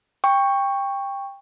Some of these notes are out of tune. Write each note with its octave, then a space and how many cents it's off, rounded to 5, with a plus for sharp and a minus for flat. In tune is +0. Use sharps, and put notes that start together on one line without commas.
G5 +20 C#6 +0